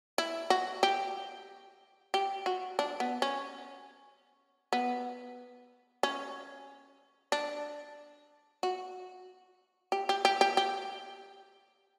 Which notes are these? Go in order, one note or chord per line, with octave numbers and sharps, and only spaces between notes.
E4
F#4
G4
G4
F#4
D4
B3
C#4
B3
C#4
D4
F#4
G4
G4
G4
G4
G4